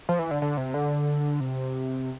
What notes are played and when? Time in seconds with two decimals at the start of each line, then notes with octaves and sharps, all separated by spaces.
0.09 F3
0.19 E3
0.31 D3
0.42 D3
0.57 C3
0.74 D3
1.40 C3